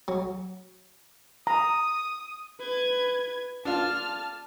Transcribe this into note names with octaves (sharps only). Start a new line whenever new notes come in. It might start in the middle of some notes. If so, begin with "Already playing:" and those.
F#3
A#5 D#6
B4 G#6
D4 F4 A5 F6